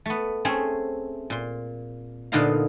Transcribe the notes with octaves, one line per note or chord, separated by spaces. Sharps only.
A3 B3
A3 C4 C#4 G#4
A#2 C6
A#2 D3 B3 D#4 C5 F5